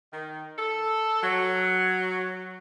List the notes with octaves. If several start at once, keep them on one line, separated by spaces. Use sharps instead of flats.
D#3
A4
F#3